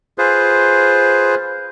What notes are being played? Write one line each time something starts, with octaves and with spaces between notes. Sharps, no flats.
F4 G#4 B4 C5